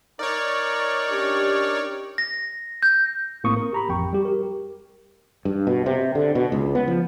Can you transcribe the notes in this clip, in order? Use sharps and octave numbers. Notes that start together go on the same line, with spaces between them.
D#4 A#4 C#5 D5
C#4 D4 G4
A#6
G6
A#1 A2 A#3 C4 C#6 D#6
A#4
G4 A#5 B5
A1 F2 G5 C#6
G3 G4
G4 A#4
G2
B2
C3
D3
B2
C#2
B3
F3